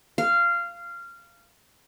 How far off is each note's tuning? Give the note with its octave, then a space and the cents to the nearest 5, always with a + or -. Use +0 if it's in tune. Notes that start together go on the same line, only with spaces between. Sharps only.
F5 -15